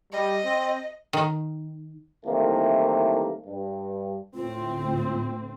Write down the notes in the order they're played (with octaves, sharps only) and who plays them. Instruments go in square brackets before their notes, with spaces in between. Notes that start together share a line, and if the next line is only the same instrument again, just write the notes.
[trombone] G3 [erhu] D#5
[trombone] C4
[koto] D#3
[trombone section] C2 C3 D#3 E3 A3 A#3
G2
[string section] D2 A2 C4 [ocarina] F4